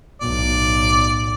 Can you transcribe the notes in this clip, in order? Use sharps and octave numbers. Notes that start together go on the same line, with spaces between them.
B1 A2 D5